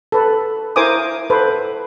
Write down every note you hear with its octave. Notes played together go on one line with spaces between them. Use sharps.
A4 B4
E4 A#4 C5 G#5 D6 D#6
A4 B4 C5